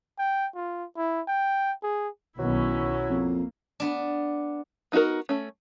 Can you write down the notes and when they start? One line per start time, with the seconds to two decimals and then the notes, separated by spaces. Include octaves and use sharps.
0.19 G5
0.55 F4
0.97 E4
1.28 G5
1.83 G#4
2.39 B1 D#3 F#3 B3 C#4 E4
3.09 F2 A#3
3.80 B3 D4
4.92 B3 D#4 F4 F#4 A#4
5.29 A3 C#4